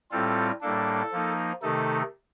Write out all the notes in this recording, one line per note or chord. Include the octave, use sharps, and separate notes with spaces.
A2 G3 C4 F4 A4
A2 G3 A#3 D4 A4
F3 A#3 D#4
C3 D#3 A3 D#4 A4